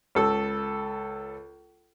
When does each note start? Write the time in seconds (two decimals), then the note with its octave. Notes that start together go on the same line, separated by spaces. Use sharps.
0.15 C#2 A4 E6